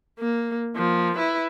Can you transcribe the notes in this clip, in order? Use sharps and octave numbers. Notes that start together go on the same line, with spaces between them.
A#3
F3 A#3
E4 B4